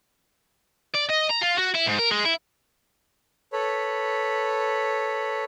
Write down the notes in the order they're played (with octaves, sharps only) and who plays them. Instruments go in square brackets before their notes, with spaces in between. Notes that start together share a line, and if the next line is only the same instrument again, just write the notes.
[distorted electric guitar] D5
D#5
A#5
F4
F#4
E4
G#2
A#4
G#3
E4
[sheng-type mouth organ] A4 B4 C#5 B5